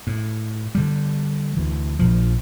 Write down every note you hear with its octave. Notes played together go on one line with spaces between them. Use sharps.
A2
D3 G3
D2 E3
A#1 F3